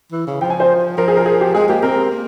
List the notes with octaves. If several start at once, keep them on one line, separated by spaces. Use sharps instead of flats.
E3
C#3
F3 G5
G#5
C5
F3 A#4
G#4
A#4
G#4
G4
G#3 G#4
A#3 G4
C4 A#4
A#3